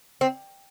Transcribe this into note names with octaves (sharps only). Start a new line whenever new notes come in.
C4